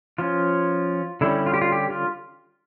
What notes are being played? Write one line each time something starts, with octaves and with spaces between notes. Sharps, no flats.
F3 C#4 F4
D3 G3 C#4 E4
F4
G4
F4
G4
F4